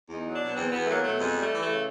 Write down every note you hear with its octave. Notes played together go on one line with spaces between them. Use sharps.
E2
D#4
F#3
D4
B2
E2 C4
E2 B3
A3
F#3 A#3
B2 A3
F2 G#3
G3 A3
E3
A3
C#3